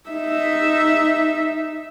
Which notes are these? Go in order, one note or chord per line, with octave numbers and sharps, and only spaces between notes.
D#4 E5